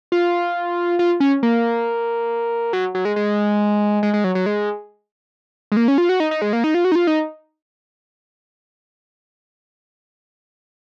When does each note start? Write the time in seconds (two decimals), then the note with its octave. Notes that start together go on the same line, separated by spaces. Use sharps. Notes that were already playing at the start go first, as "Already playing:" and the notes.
0.12 F4
0.99 F4
1.20 C#4
1.43 A#3
2.73 F#3
2.95 F#3
3.05 G#3
3.16 G#3
4.03 G#3
4.14 G#3
4.24 F#3
4.35 F#3
4.46 G#3
5.72 G#3
5.77 A#3
5.88 C#4
5.98 F4
6.09 F#4
6.20 D#4
6.31 D#4
6.42 G#3
6.53 A#3
6.64 D#4
6.74 F4
6.85 F#4
6.92 D#4
6.95 F4
7.07 D#4